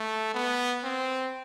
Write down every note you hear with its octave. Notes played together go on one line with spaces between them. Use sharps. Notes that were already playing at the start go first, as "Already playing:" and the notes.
Already playing: A3
B3
C4